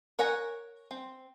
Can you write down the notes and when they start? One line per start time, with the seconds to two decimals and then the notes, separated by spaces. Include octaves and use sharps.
0.19 A#4 C#5 F#5 G#5 A#5
0.91 C4